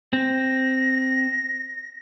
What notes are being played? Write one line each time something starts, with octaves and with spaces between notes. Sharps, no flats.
C4 A#6